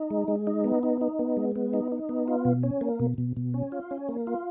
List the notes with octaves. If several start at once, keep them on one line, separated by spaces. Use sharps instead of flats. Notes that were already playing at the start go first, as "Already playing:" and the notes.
Already playing: D#4
G#3
G#3
D#4
B3
D#4
D#4
B3
G#3
B3
D#4
D#4
B3
F4
B2
C#4
A#3
B2
B2
B2
C#4
F4
C#4
A#3
F4